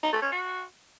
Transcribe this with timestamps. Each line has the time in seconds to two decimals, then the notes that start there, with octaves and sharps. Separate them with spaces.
0.03 D#4
0.13 A3
0.22 C#4
0.32 F#4